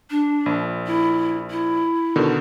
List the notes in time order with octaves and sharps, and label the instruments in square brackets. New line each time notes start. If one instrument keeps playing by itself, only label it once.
[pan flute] D4
[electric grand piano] A#1
[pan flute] E4
E4
[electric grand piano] B2 D3 D#3